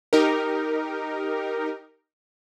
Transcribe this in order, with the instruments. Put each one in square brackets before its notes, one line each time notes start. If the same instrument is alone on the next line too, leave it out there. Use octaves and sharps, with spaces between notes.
[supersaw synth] D#4 G4 A#4